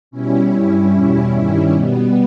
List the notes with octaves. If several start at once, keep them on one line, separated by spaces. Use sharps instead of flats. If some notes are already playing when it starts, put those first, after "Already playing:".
B2 G3 C#4 E4
G2 G3
E2 B2 G3 C#4 E4
G2 D#3 G3
B2 G3 B3